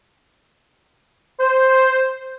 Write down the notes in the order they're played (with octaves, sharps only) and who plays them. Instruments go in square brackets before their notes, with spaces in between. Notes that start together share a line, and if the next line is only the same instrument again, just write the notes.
[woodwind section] C5